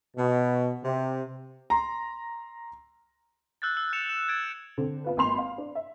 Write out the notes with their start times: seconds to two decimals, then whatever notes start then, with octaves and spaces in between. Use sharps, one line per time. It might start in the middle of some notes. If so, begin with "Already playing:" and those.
0.17 B2
0.83 C3
1.70 A#5 C6
3.62 E6 F#6 G6 A6
3.77 E6
3.93 F#6 C#7 E7 F7
4.09 E7
4.29 G#6 A6 D7
4.78 D3 C4
5.04 B3 F4 B4
5.17 G#1 A#3 B5 C6 F7
5.38 F5
5.58 D4
5.75 E5